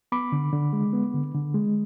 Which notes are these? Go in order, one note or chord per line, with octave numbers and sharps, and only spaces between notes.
B3 B5 D6
D3
D3
G#3
B3
D3
D3
G#3